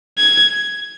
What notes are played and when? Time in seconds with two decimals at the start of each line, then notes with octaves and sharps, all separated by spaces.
0.18 G#6